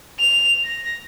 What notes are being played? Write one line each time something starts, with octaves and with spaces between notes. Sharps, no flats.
F7
A#6